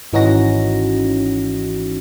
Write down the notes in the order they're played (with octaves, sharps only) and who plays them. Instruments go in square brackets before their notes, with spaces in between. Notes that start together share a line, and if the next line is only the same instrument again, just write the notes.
[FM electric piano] G#1 E3 C#4 D#4 F#4 A#6